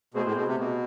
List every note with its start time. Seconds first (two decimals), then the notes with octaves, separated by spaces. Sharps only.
0.14 B2 A3 C4 G#4 C5
0.25 A2
0.37 B2
0.48 C3
0.58 B2